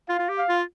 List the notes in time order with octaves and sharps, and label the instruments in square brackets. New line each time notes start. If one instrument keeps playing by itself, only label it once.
[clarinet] F4 [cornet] F5
[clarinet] F4
G4
[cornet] F5
[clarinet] F4